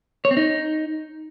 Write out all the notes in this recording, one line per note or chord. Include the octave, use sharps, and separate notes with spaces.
C#5
C4
D#4